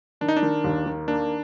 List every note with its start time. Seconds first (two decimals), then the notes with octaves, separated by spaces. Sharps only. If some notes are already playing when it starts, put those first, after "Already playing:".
0.21 D#3 D4
0.28 D#4
0.37 D4
0.42 D#3
0.64 D#2
0.86 D#3
1.07 A#3 D4